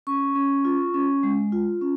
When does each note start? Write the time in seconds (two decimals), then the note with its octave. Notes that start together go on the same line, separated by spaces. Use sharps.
0.07 C#4 C#6
0.35 C#4
0.65 F4
0.94 C#4
1.23 G#3
1.52 F4
1.81 C#4